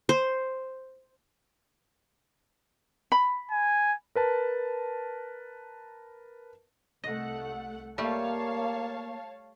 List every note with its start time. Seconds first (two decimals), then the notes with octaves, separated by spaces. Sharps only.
0.09 C5
3.12 B5
3.51 G#5
4.15 A#4 B4 A5
7.04 C2 A3 D#5 F#5
7.98 G3 A3 A#3 G4 C#5 F5 A5